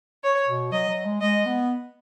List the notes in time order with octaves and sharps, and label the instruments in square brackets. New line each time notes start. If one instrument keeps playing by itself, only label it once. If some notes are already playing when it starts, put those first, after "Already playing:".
[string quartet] C#5
[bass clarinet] B2
[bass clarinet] F#3 [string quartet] D#5
[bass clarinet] F#3
G#3
[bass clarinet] G#3 [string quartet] D#5
[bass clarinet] B3